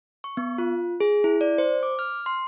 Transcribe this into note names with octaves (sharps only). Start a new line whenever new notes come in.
C#6
B3
F4
G#4
E4
D5
C5
D6
F6
C6